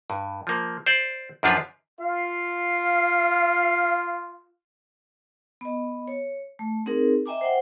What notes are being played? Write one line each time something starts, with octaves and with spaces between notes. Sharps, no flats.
G2
F3 A#3
C5 D5
F#2 F3 D4 F4 B4
F4 F5
B3 D#5
C#5
A3
C4 D#4 G#4 A#4
D#5 E5 G5 G#5 A#5 D6
C5 F#5 G5